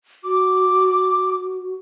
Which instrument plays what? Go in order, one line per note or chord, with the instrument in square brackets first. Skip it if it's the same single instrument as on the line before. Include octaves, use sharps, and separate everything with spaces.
[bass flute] F#4 [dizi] D6